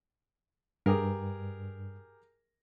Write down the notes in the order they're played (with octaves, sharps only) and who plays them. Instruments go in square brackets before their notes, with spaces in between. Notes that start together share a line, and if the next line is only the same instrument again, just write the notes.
[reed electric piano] G2 [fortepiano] G4 G#4 A#4